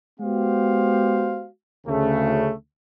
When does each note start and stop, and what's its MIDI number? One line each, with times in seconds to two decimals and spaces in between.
0.20 1.48 56
0.20 1.48 59
0.20 1.48 66
0.20 1.48 67
0.20 1.48 72
0.20 1.48 77
1.87 2.52 38
1.87 2.52 49
1.87 2.52 57